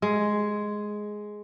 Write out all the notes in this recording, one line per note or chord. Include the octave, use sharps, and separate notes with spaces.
G#3